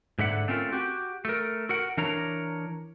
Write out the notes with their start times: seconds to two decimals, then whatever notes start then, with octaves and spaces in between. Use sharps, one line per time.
0.19 G#2 D3 E5 F#5
0.48 A3 C4 C#4 F4 A#4
0.72 F#4 G4
1.25 A3 A#4
1.69 F#4 A#4 F#5
1.97 E3 D4 A#4 C#5 A#5